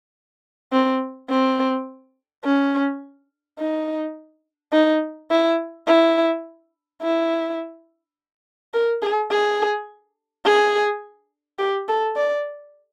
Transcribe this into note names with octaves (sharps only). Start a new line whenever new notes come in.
C4
C4
C#4
D#4
D#4
E4
E4
E4
A#4
G#4
G#4
G#4
G4
A4
D5